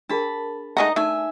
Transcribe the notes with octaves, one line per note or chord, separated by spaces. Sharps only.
D4 G#4 A#4 A5 B5
G#3 A3 D#4 D#5 F#5 A#5
A3 D4 D#4 E5 G#5 A5